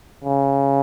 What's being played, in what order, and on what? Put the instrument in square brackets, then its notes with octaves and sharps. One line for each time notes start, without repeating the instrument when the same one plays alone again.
[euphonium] C#3